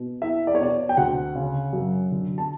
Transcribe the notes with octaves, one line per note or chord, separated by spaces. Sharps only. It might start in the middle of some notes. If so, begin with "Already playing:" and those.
Already playing: B2
E4 E5
D5
C#5
B2 D5
G5
D2 F#5
C#3
F#2
D3
A5